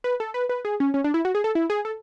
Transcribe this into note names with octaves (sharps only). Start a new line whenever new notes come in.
B4
A4
B4
B4
G#4
C#4
C#4
D4
E4
F#4
G#4
A4
E4
G#4
A4